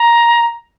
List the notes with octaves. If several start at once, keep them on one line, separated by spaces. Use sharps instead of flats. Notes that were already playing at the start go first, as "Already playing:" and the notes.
Already playing: A#5